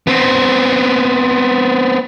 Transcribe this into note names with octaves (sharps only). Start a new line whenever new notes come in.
B3 C4